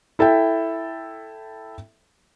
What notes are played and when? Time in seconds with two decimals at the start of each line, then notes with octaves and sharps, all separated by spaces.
0.19 E4 A4 E5 G5